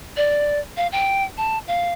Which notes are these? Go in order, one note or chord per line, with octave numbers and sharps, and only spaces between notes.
D5
F5
G5
A5
F5